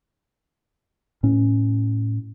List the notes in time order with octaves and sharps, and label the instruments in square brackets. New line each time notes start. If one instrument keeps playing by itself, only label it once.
[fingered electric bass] A2 C#4